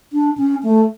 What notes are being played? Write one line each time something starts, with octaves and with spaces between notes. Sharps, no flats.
D4
C#4
A3